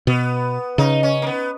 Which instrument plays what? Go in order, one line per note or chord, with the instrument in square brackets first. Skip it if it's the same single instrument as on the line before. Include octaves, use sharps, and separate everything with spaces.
[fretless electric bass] B2 [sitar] B3
[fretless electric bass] C#3 [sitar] D#4
[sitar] C#4
A#3
B3